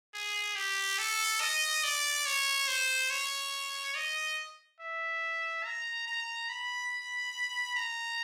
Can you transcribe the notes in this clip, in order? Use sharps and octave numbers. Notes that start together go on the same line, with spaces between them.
G#4
G4
A4
D#5
D5
C#5
C5
C#5
D#5
E5
A#5
A#5
B5
A#5